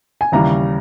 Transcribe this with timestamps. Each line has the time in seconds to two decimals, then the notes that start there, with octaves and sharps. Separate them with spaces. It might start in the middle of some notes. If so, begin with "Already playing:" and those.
0.21 G#5
0.32 D#2 C#3 E3 G3 A#5